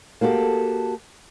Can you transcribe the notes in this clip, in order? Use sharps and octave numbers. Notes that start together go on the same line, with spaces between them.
A#3 F#4 G4 A4